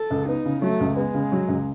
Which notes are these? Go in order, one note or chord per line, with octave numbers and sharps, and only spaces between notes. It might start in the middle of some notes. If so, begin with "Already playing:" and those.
Already playing: A4
C#2
B3 D#4
C#3
F#3 A3
C#2
G#3 B3
C#3
F#3
C#2